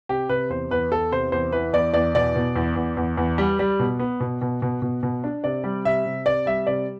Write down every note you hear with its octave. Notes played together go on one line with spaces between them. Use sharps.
C3 G4
C3 B4
E2 C5
E2 B4
E2 A4
C3 C5
E2 C5
E3 B4
E2 D5
E2 D5
B2 D5
B2
E2
E2
E2
E2
G3
G3
B2
B3
B2
B2
B2
B2
B2
D4
C3 D5
G3
C3 E5
C3
C3 D5
G3 E5
C3 D5